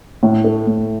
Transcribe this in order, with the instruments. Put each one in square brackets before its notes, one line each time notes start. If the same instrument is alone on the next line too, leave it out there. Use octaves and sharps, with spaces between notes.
[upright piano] A2
A3
A2